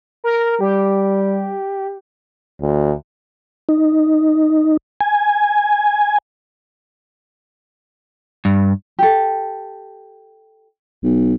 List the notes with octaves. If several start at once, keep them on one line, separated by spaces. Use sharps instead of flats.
A#4
G3 G4
D2
D#4
G#5
G2
G4 A4
B1